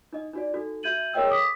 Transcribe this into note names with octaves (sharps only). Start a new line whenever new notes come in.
D#4 D#5
D#4 F#4 D5
D#4 F#4 A4
F#4 E5 G6 G#6 D#7 F#7
G#4 A#4 C#5 D#5 G5 E6
D6 D#6 B6